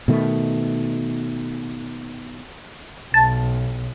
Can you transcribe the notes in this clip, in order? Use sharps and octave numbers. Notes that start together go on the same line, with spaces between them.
B2 D#3 A3
B1 A5